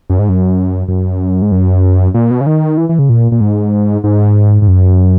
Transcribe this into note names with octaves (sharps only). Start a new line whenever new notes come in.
F#2
G#2
F#2
F#2
G#2
F#2
A#2
B2
C#3
D#3
E3
E3
C#3
A#2
A#2
G#2
G#2
G#2
F#2